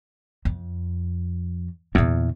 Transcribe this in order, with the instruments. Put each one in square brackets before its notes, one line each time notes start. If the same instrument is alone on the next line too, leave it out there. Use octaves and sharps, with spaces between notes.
[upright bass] F2
[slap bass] E2 [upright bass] A#2 D3